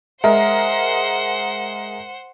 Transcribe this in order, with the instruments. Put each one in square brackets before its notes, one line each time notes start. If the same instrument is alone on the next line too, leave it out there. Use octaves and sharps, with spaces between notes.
[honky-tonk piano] G#3 A#4 [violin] C5 F#5 [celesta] E5